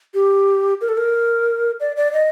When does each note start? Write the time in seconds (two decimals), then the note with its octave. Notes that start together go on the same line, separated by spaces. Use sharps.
0.14 G4
0.81 A#4
0.89 A4
0.97 A#4
1.80 D5
1.96 D5
2.13 D#5